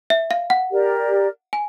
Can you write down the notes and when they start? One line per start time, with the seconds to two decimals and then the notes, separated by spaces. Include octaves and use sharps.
0.10 E5
0.31 F5
0.50 F#5
0.70 G4 A#4 D5
1.53 G#5